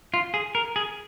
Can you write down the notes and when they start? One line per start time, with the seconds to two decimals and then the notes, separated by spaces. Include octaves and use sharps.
0.14 F4
0.34 G#4
0.55 A#4
0.76 G#4